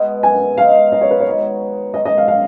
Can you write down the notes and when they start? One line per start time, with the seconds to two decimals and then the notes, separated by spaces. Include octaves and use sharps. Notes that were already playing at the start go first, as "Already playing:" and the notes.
Already playing: B2 G#3 B3
0.23 G#5
0.58 D#3 G#3 D#4 F5
0.92 D#5
1.01 C#5
1.11 B4
1.20 C#5
1.26 G#3 D#4 F#4 B4
1.94 G#2 D#3 G#3 D#5
2.05 D#5
2.18 F5
2.28 F5